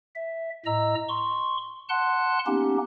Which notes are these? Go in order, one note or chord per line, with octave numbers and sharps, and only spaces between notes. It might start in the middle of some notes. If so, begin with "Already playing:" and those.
E5
A2 D#5 A#5 E6
C6 C#6
F#5 A5 C6 F#6
A#3 B3 C#4 D#4 G4